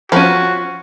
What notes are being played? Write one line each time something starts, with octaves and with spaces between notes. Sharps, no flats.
F3 C#4 F#4